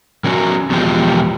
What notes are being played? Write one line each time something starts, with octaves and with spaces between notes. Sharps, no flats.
D#3 C#4 F#4
E2 B2 F3 G#3 G4